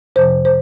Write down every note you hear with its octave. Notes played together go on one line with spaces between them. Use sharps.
F2 C3 F3 C5
C5